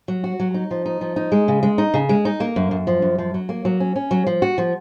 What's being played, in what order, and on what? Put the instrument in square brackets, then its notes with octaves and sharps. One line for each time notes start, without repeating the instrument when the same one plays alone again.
[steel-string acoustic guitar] F#3
F#4
F#3
D#4
F3
D#4
F3
D#4
G#3
C#3
G#3
D#4
C#3
G#3
D#4
A#3
F#2
F#2
F3
F#2
F3
F#3
A#3
F#3
C#4
C#4
F#3
F3
F#4
F3